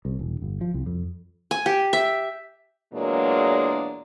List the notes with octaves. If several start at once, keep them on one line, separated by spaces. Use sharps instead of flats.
C2
E1
G1
F3
C2
F2
G#5
G4
E5
E2 A#2 F#3 G#3 A#3 D4